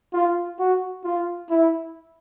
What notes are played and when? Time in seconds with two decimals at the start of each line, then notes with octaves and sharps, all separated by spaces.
0.13 F4
0.59 F#4
1.04 F4
1.50 E4